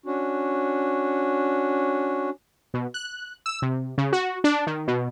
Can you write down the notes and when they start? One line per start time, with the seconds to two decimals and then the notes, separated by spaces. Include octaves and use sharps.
0.06 C#4 D4 F#4
2.74 B2
2.94 F#6
3.46 E6
3.62 C3
3.98 C#3
4.13 F#4
4.44 D4
4.67 D#3
4.88 B2